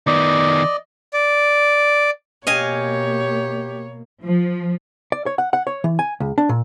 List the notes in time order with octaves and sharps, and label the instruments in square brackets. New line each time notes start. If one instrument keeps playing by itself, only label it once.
[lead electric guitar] D#3 B3 [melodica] D5 D#5
[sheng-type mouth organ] D5
[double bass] B2 A#3 [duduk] G4 [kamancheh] C#5 [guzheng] D#5 F5 G#5
[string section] F3
[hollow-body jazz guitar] D5
C#5
F#5
F#5
C#5
E3
G#5
C#2
D4
A#2